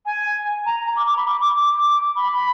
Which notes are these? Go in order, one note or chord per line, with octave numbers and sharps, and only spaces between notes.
G#5
A#5
D6
D6
B5
D6
D6
D6
B5